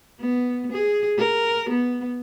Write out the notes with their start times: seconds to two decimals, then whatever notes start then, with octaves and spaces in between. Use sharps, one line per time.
0.20 B3
0.73 G#4
1.18 A#4
1.70 B3